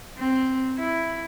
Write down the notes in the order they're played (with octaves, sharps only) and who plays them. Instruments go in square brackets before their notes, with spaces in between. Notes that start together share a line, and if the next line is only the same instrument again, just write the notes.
[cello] C4
E4